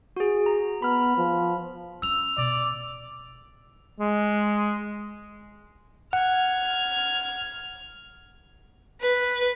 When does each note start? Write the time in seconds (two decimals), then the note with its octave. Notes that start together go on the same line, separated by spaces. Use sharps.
0.17 F#4 G#4
0.46 A#5
0.82 B3 B5 F6
1.17 F3
2.02 C#4 D4 E6 F7
2.37 B2 D5
4.00 G#3
6.13 F#5 F6 G#6
9.01 B4